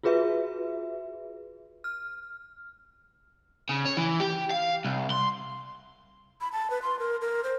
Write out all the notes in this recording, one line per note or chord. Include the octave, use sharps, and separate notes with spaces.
F4 F#4 G#4 B4 E5
F6
C#3
C#5
E3
G4
F5
C2
C6
B5
A5
B4
C6
A#4
A#4
C5